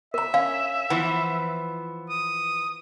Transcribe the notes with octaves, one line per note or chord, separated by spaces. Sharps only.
A#4 E5 A#5
C#4 F5
E3 F3 B3
D#6